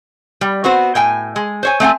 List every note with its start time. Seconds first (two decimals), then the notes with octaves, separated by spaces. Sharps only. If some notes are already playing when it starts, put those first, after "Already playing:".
0.41 G3
0.64 B3 C4 F#4 C5
0.95 A2 G5 G#5
1.36 G#3
1.63 C5 C#5 G#5
1.80 A3 C4 F#5 G#5